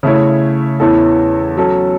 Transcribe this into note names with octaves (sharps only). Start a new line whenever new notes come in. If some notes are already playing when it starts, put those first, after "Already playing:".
C#3 A3 E4 C#5
E2 E3 C#4 E4 A4
F#3 C#4 A4